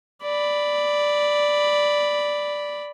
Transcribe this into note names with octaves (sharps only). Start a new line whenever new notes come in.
D5 B5